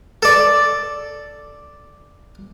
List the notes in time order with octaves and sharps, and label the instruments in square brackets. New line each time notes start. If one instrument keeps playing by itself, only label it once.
[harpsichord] A4 D5